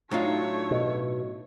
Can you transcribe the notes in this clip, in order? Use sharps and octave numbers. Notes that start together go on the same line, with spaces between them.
A2 F#3 A3 D4 D#4 F4 C#5
B2